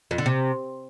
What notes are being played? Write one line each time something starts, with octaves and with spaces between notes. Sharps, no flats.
F2
D3
C3